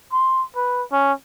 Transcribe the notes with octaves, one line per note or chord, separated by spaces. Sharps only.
C6
B4
C#4